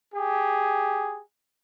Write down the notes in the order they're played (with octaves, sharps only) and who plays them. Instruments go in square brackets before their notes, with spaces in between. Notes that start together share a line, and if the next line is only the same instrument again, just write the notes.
[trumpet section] G4 G#4